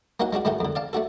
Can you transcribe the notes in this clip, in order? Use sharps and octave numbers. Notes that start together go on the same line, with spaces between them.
A#3 C#4 D#4 F#4 F#5
G#3 C#4 D4 F#4
G#2 D#3 A3 C#4 D#4 F#4
F2 D3
D5 F5 A5
A3 D4 F#4 A4